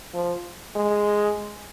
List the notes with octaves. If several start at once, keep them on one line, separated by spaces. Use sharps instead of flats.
F3
G#3